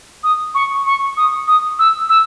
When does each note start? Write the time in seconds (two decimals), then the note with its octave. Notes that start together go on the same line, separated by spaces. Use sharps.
0.24 D#6
0.55 C#6
0.86 C#6
1.17 D#6
1.48 D#6
1.79 E6
2.10 E6